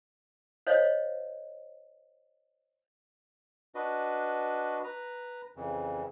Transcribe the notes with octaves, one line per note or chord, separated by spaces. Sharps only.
C5 C#5 D#5 F5
D4 F#4 B4 D#5
B4 A#5
F2 C#3 E3